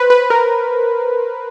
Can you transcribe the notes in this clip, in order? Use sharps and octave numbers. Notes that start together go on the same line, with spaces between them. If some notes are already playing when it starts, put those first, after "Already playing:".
Already playing: B4 C5
B4
A#4